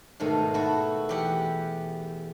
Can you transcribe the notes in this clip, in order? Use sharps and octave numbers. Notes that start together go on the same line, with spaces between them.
G#2 B2 D#3 A3
E4 F#4 A4
E2 G4 F#5